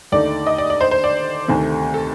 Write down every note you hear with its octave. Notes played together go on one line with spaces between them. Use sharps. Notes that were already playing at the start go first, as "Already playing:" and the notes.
D#2 D3 A3 D#4 D5
D#5
D5
D5
C5
C5
D5
D2 C3 D#3 A3
A4